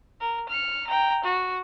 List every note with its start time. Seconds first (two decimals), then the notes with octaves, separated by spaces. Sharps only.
0.21 A#4
0.49 F6 C#7
0.87 G5 A#5
1.24 F#4